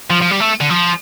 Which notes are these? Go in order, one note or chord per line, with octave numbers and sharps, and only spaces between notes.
F3
F3
G3
A3
D3
F3